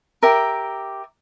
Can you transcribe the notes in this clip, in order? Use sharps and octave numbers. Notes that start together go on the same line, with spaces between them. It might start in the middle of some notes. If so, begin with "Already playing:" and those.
G4 A#4 E5